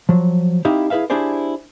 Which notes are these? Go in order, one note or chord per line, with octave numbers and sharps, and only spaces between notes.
F3 F#3
C4 D#4 E4 G4 E5 F5
E4 G#4 B4 E5 F5
D4 E4 G4 G#4 C5 D5